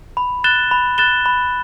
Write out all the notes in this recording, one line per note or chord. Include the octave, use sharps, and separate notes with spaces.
B5
F#6 A6 E7 G7
B5
F#6 A6 E7 G7
B5